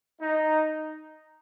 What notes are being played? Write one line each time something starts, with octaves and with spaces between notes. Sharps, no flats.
D#4